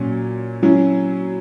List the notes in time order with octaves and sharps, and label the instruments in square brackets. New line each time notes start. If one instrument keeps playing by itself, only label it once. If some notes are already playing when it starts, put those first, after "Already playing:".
Already playing: [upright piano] A#2 F#3 C#4
F#3 C#4 E4